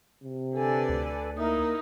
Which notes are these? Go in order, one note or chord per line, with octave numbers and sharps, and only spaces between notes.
C3
D3 A4 B4 D5 G#5
D2
A#3 D#4 E4 A#4 E5 D#6